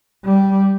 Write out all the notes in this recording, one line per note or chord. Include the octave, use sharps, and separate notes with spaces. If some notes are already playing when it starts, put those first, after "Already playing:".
G3